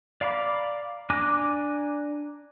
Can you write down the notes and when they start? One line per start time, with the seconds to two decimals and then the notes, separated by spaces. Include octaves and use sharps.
0.21 D5 F5 A#5 B5 D6
1.10 D4 G#5 A#5 D6 F#6